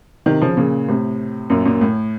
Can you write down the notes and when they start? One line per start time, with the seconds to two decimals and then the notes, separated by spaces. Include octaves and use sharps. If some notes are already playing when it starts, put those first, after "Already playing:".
0.26 C3 D#3
0.41 C#3 F3
0.57 A#2 C#3
0.88 A2 C3
1.50 F#2 A#2
1.66 F#2 A#2
1.81 A2